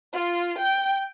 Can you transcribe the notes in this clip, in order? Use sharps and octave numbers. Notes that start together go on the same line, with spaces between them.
F4
G5